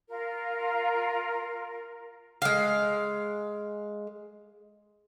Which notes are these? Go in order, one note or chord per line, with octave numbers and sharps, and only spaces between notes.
F4 A#4
G#3 F5